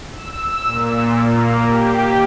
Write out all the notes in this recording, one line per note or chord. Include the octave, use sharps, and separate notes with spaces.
E6
A#2
A#3
G4